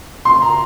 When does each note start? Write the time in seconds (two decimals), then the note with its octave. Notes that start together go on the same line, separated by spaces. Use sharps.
0.25 C6
0.42 A#5